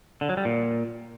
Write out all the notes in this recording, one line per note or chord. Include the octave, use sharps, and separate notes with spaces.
D3
F#3
G3
A#2